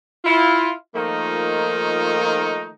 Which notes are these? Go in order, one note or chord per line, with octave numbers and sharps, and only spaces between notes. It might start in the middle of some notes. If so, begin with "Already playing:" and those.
E4 F4
D#3 F3 A3 A#3 D#4 F4